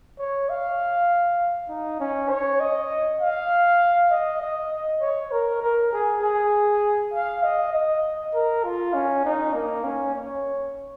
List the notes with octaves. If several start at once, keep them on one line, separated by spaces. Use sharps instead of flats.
C#5
F5
D#4
C#4
C#5
D#5
F5
D#5
D#5
C#5
A#4
A#4
G#4
G#4
F5
D#5
D#5
A#4
F4
C#4
D#4
A#3
C#4
C#5